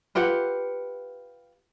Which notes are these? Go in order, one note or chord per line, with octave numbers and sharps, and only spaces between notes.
F4 G4 B4 F#5